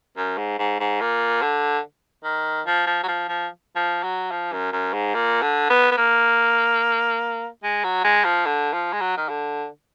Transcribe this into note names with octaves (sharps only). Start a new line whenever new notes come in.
F#2
G#2
G#2
G#2
A#2
D3
D#3
F3
F3
F#3
F3
F3
F3
F#3
F3
F#2
F#2
G#2
A#2
D3
B3
B3
A#3
G#3
F#3
G#3
F3
D3
F3
G#3
F#3
D#3
D3